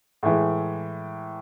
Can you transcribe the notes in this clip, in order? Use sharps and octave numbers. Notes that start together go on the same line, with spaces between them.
A2 E3 G#3